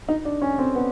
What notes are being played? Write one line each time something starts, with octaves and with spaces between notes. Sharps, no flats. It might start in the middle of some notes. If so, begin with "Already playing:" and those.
D#4
D4
C#4
C4
B3